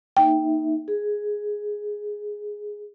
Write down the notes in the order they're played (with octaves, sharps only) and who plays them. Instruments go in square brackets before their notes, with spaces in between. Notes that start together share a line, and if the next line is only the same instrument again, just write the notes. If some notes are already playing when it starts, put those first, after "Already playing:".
[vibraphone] A#3 D#4 E5 [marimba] G5
[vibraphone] G#4